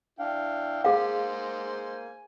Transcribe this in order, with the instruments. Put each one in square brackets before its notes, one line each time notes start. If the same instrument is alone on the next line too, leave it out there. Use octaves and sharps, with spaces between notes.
[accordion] D4 F5 [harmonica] E4 G5
[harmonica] G#3 C5 G#5 [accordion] A#3 [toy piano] G#4 F5